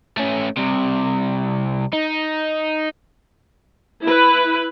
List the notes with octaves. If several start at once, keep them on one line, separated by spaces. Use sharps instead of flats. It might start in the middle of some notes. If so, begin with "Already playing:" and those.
A3 C#4
C2 C3
D#4
E4 B4